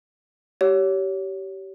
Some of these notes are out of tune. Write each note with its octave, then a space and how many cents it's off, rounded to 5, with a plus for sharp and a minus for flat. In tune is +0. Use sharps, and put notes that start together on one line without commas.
G4 -25 C#5 +20